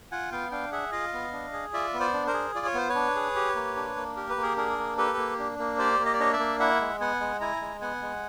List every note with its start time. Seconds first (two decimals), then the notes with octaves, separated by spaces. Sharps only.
0.12 F4 F#5 G#5
0.32 B3 F5 G5
0.51 D4 F5 G5
0.72 G#4 E5 F#5
0.92 F4 D#5 F5
1.13 B3
1.32 D4
1.53 G#4
1.73 F4 D5 E5
1.94 B3
2.00 C5 D5
2.13 D4
2.27 A#4 C5
2.34 G#4
2.55 F4 D5
2.66 C#5
2.74 B3 C5
2.89 B4 C#5
2.95 D4
3.16 G#4
3.36 G4
3.55 A#3
3.76 D4
3.96 A#3
4.17 G4 A#4
4.30 B4
4.36 A#3
4.42 G#4 A#4
4.57 D4 G#4 A#4
4.78 A#3
4.97 G4 A4 B4
5.17 A#3
5.39 D4
5.59 A#3
5.78 G4 C5 D5
5.99 A#3
6.05 D#5
6.13 D5
6.20 D4 C#5 D#5
6.33 D5 E5
6.39 A#3
6.60 E4 E5 F#5
6.81 G#3
7.00 B3 F#5 G#5
7.20 G#3
7.41 E4 G#5 A#5
7.61 G#3
7.81 B3 F#5 G#5
8.02 G#3